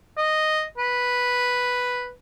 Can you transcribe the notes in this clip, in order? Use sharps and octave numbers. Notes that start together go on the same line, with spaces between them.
D#5
B4